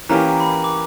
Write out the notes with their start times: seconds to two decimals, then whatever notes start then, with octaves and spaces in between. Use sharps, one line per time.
0.09 E3 A#3 C#4 G4 A#4 A#5
0.40 B5
0.64 D6